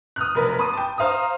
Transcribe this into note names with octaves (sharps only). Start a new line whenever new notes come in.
D#6 F6 F#6
F1 B1 A#4 B4
A5 B5 C6 D6 D#6 D#7
G5 A5
C5 F5 A#5 D#6